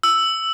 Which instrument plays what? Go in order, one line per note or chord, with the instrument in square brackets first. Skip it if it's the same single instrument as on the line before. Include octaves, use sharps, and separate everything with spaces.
[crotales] E6